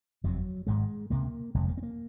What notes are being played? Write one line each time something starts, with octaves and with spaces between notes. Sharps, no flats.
F#1 F2 C3 F#3
G#1 G#2 G#3
C#2 C3 A#3
F#1 F2 C3 G#3
A#3
C4
A#3